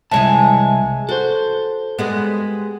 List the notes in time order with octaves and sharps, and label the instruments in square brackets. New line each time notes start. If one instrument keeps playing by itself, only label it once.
[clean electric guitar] C2 C#5 A5 [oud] E3 G#3 G#4
[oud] F#4 [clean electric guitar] A4 C5
[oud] G3 G#3 B3